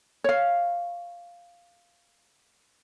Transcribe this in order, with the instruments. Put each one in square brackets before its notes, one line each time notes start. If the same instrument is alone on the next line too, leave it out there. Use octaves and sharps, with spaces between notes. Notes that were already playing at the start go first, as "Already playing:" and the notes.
[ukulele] C#5 F5